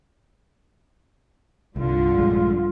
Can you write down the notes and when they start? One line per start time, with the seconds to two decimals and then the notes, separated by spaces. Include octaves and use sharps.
1.76 C2 G2 D3 F4
2.15 A#1 G#3